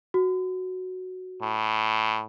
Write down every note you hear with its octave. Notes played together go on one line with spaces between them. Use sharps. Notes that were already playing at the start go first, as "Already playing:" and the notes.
F#4
A2